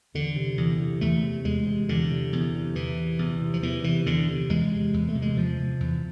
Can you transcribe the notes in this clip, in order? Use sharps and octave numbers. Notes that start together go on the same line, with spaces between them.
E2 D3
C3
E2
C3
E2 A3
C3
E2 G#3
C3
E2 D3
C3
E2
C3
E2 E3
C3
E2
C3
F3
E2 E3
C3 E3
E2 D3
C3
E2 G#3
C3
E2
A3
C3
G#3
E2 F3
C3
E2